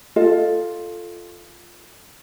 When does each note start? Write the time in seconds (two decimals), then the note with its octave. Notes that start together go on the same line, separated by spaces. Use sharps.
0.16 F4 A4 D#5